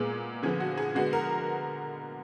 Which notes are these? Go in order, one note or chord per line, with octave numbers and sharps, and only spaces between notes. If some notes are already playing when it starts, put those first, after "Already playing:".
Already playing: A#2 G#3 B3 G#4
D3 F3 B3 G#4
F#4
G#4
D3 G#3 B3 F#4
A#4